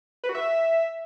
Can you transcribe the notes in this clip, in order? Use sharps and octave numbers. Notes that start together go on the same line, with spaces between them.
B4
F#4
E5